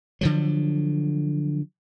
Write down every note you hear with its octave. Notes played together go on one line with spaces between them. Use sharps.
D3 F3 F#3